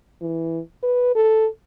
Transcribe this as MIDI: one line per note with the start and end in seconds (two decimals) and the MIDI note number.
0.21 0.60 52
0.83 1.12 71
1.15 1.47 69